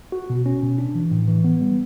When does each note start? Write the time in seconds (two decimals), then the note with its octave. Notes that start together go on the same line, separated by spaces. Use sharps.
0.12 F#4
0.30 B2
0.46 C#4
0.63 B2
0.78 D4
0.95 E3
1.11 A2
1.28 E3
1.44 B3
1.61 G3